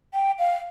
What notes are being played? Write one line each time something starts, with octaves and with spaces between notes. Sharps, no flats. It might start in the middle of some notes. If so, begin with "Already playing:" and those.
G5
F5